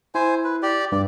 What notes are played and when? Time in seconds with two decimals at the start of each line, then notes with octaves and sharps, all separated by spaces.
0.15 E4 C5 G#5
0.44 B4
0.62 G4 D5
0.92 G2 D5